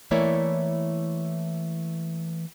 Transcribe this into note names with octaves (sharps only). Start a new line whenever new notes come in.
E3 A3 A#3 E4 C#5 D5